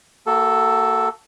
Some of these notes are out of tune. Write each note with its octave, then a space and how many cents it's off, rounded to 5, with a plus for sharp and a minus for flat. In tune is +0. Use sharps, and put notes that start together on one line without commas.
A#3 -25 F#4 +30 A4 +0